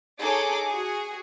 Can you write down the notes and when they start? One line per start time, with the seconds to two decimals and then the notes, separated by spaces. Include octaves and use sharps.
0.20 D#4 G#4 A4 C#5 D6
0.67 F#4 G#4